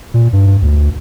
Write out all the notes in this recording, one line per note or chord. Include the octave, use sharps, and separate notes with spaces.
A#2
G2
D2